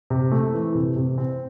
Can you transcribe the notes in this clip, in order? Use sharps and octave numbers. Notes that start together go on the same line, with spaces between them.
C3
A3
E3
C3
C3
C4